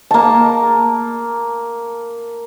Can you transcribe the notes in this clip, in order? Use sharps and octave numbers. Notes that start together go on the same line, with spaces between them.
A#3 A5